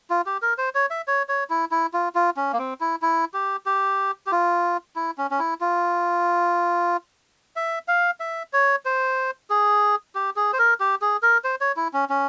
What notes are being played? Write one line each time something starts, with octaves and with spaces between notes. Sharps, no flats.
F4
G4
A#4
C5
C#5
E5
C#5
C#5
E4
E4
F4
F4
C#4
A#3
C4
E4
E4
G4
G4
G4
F4
E4
C#4
C#4
E4
F4
E5
F5
E5
C#5
C5
G#4
G4
G#4
C5
A#4
G4
G#4
A#4
C5
C#5
E4
C#4
C#4